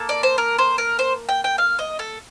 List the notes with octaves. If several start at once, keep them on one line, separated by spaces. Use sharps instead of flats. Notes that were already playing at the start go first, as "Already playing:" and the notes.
Already playing: A#3 A4
D5
C5
A#4
C5
A#4
C5
G5
G5
F5
D#5
A4